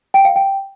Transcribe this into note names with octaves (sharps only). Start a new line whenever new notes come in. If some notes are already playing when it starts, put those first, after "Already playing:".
G5
F5
G5